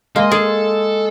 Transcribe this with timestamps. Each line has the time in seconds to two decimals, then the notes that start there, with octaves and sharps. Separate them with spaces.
0.16 G#3 A#3 D#5 F5
0.31 G#4 A4